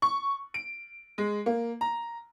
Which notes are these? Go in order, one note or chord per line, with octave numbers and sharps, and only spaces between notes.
C#6
D7
G#3
A#3
A#5